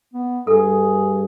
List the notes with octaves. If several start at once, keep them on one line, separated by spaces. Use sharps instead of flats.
B3
G2 G#4 A4